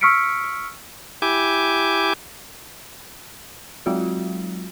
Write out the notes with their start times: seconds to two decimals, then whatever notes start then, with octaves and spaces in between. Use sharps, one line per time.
0.01 C#6 E6 F6 B6 C#7 D7
1.22 E4 G4 G#5 D6
3.86 F#3 G#3 C4 F4 F#4